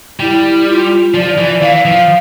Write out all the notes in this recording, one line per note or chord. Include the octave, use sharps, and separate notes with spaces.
G3 E4
F4
F3 D5
E3
E3 F5
F3